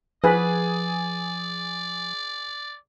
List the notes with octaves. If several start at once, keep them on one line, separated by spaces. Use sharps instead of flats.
F3 G#4 B4 D5